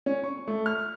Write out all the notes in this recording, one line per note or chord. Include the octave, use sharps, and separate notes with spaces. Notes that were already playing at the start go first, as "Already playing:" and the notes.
C#4
C#6
A3
F6